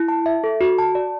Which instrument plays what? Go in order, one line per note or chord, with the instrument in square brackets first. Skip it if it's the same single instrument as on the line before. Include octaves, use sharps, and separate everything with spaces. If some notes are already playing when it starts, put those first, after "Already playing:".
Already playing: [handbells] E4
A5
E5
A4
F#4
A5
D5